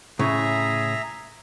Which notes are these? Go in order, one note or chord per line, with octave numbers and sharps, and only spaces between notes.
A2 C#3 G#4 E5 A#5